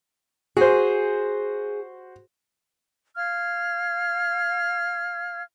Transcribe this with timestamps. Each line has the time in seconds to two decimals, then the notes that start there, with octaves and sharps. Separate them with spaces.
0.57 F#4 G#4 C5
3.16 F5 F6 G#6